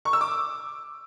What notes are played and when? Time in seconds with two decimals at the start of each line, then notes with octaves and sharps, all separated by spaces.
0.05 C#6
0.13 E6
0.21 D6